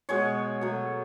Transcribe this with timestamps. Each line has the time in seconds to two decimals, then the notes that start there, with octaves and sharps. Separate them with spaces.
0.09 B2 G#3 C#5
0.61 B2 F#3 A3